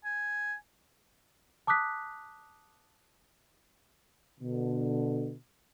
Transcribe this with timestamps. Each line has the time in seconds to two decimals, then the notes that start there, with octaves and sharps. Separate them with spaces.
0.05 G#5
1.67 A5 D6 D#6 F#6 B6
4.40 B2 D3